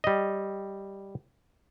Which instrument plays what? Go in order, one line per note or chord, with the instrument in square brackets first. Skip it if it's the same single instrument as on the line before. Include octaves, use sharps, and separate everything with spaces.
[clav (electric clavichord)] G3 D#5